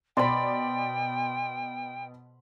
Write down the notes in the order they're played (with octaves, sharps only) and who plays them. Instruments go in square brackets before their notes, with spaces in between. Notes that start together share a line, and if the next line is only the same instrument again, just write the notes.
[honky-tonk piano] B2 D5 [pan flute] G5 [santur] B5 C6